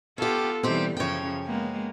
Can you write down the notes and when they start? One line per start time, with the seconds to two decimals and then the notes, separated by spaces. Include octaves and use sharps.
0.18 B3 C#4 F4 G4 A4
0.63 B2 E3 G3 C4 D#4 G4
0.97 F#2 C#3 F3 C#5 G5
1.46 G#3 A#3 B3